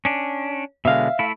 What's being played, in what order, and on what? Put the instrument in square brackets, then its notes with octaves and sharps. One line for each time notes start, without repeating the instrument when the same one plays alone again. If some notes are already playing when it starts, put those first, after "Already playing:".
[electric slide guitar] C#4 D4
[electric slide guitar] B2 D3 G#3 [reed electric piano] E5 F5
[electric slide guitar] A3 E4